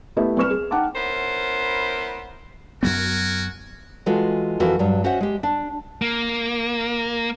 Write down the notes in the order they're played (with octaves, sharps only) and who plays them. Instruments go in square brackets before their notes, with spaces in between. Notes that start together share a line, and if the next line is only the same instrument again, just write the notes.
[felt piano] A3 B3 E4 G4
C2 B4 C#6 F6 E7
G#4
D#4 F#5 G5 A5 D6
[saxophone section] B3 C#4 E4 A#4 C5
[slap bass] F#2 F#3 B3 [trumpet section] F#4 A#4 G#5
[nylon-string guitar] E3 G#3 F4 F#4 A4
F2 E3 F#4 A4 A#4
G2 F#3 G3
C#4 F#4 C5 D#5 E5 F#5
G#3 G4
D4
[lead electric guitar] A#3